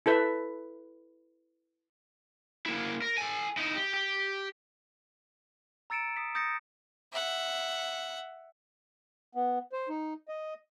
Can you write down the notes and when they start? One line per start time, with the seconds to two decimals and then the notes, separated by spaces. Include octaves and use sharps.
0.06 E4 A4 B4 E5
2.66 A#3 E4
3.02 A#4
3.18 A4 G#5
3.57 D#4 E4
3.75 G4
3.94 G4
5.90 A#5 E6 A6 C#7 D7 E7
6.17 D#6 B6
6.35 D#6 G6 A6 A#6 C#7
7.12 E5 F#5
9.35 B3
9.72 C5
9.89 D#4
10.28 D#5